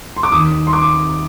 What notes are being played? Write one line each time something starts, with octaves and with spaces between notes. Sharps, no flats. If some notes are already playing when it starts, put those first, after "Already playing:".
C6
D6
D#2 D#3 D#6
C6
D6